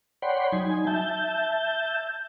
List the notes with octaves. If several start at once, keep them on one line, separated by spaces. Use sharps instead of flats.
C#5 D5 F#5 G5 B5 C6
F#3 D#4 G#5
E5 A5 G6